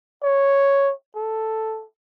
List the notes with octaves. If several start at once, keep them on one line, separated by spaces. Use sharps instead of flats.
C#5
A4